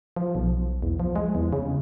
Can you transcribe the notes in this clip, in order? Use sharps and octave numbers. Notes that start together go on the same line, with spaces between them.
F3
B1
E2
F3
G#3
E2
C#3